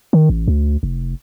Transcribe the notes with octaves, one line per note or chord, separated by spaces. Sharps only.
D#3
A1
D2
F1